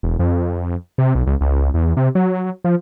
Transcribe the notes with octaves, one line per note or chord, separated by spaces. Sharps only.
E1
F2
C3
B1
C#2
C#2
E2
C3
F#3
F3